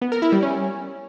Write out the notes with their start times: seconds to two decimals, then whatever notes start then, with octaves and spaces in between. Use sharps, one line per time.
0.02 B3
0.12 A#4
0.22 E4
0.32 G3
0.43 C#4